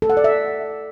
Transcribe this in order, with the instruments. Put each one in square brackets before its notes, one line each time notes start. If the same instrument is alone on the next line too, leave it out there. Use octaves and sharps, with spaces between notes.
[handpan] A4
F#5
D5
E5